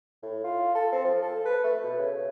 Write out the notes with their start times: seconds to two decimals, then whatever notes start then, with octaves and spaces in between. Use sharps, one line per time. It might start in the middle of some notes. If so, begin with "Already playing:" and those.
0.23 A2
0.44 F4
0.75 A4
0.92 C4
1.04 F3
1.22 A4
1.45 B4
1.64 A3
1.84 B2
1.98 C#3